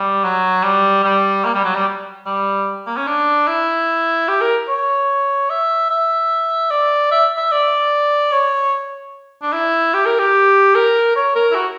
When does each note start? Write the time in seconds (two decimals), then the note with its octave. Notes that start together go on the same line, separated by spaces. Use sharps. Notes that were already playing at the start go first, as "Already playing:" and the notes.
Already playing: G3
0.24 F#3
0.64 G3
1.04 G3
1.45 A#3
1.55 G3
1.65 F#3
1.75 G3
2.26 G3
2.87 A#3
2.97 C#4
3.07 D4
3.48 E4
4.28 G4
4.41 A#4
4.68 C#5
5.50 E5
5.90 E5
6.71 D5
7.11 E5
7.37 E5
7.52 D5
8.32 C#5
9.42 D4
9.53 E4
9.94 G4
10.06 A#4
10.19 G4
10.75 A#4
11.16 C#5
11.35 A#4
11.51 E4
11.55 F#4